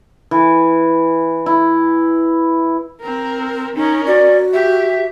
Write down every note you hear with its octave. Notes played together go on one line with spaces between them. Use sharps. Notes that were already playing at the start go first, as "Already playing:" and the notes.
E3
E4
C4 A#4
C#4 D#4 A#4
F#4 D5
G4 E5